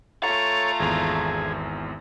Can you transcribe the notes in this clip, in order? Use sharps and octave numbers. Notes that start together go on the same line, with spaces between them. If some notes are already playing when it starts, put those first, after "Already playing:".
A3 F4 A4 C#5 A#5
G#1 E2 G#4